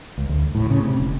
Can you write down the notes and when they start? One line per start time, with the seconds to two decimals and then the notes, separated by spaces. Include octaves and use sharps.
0.18 C#2
0.29 D2
0.55 A2
0.70 C#3
0.83 C3
1.00 E1